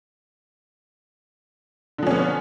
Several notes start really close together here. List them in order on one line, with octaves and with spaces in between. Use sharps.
D3 F3 C#4 B3